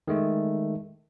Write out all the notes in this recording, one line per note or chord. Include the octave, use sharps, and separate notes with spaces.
D#3 G#3 A3